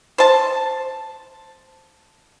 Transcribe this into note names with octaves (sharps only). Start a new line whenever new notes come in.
C5 A5